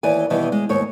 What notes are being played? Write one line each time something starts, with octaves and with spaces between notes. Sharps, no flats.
D#2 E3 D5 G#5
B2 D#3 E3 G3
G#3
D#2 G#2 C#5